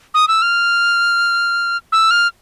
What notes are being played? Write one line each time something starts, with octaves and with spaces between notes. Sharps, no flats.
D#6
E6
F6
E6
F6